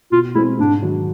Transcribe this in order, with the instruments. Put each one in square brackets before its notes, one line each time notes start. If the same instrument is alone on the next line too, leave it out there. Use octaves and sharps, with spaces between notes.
[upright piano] B2 [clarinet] F4
[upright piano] G#3 C4 [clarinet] E4
[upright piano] G#2 [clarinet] D4
[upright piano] D#3 F#3